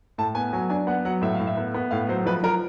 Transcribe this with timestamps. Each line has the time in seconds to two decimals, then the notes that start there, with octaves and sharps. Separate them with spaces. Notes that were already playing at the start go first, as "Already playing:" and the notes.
0.18 A2 A5
0.35 B3 G#5
0.53 F#3 G#5
0.69 D4 G#5
0.87 B3 F#5
1.05 F#3 F#5
1.22 A2 E5
1.34 F5
1.40 A2
1.47 E5
1.57 B3
1.74 B3
1.91 A2 F5
2.09 F#3 C5
2.26 F3 B4
2.43 F3 A#4